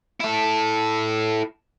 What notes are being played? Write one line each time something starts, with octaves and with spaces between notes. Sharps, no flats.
E4 A4